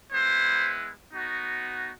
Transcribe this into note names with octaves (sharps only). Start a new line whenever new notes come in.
G#3 B3 E4 C5
B3 D#4 F#4